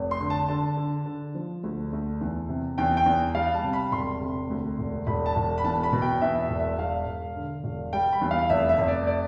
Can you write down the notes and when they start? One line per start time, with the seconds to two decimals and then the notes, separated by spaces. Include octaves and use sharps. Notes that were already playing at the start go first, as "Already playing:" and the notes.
Already playing: F1
0.11 C6
0.20 D3
0.30 A5
0.49 D3 A5
0.77 D3
1.06 D3
1.35 F3
1.63 D2
1.93 D2
2.21 E2
2.49 C3
2.78 E2 G5
2.97 G5
3.06 E2
3.35 G3 F5
3.54 A5
3.64 C3
3.73 B5
3.92 E1 C6
4.21 C3
4.50 D2
4.79 E1
5.07 E1 B5
5.26 A5
5.36 E1
5.58 B5
5.64 E2 A5
5.83 B5
5.92 B2
6.02 G5
6.22 E2 E5
6.40 E5
6.50 E1
6.59 E5
6.79 E1 F5
7.07 E1
7.36 D3
7.64 E1
7.93 G3 G5
8.13 B5
8.21 E2
8.31 F5
8.50 F1 E5
8.69 E5
8.79 F1
8.84 E5
8.88 D5
9.07 D5